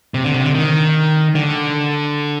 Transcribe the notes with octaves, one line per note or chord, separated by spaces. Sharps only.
C3
D3
C3
D3
D#3
D3